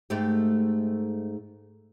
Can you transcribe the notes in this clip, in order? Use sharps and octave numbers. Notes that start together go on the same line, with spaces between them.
G#2 A3 G4